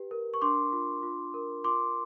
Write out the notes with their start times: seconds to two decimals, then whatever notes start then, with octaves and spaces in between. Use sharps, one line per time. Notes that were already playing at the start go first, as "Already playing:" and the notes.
Already playing: G4 B4
0.11 A#4
0.34 C#6
0.41 D4 C6 D6
0.72 F4
1.03 F4
1.34 A#4
1.64 F4 C6 D6